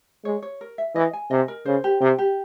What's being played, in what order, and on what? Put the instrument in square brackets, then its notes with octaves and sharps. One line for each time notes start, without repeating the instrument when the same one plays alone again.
[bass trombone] G#3 [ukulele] C#5
[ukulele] C#5
A#4
E5
[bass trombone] E3 [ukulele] D#5
[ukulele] G#5
[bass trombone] C3 [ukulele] D#5
[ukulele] A#4
[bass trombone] C#3 [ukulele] C5
[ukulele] G4
[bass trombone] C3 [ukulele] G4
[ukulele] G4